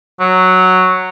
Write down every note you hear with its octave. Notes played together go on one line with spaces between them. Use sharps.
F#3